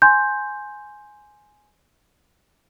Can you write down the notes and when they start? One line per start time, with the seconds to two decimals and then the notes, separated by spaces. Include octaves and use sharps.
0.02 G#5 C6 G6